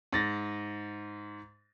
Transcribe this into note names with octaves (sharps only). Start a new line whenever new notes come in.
G#2 A6 A#6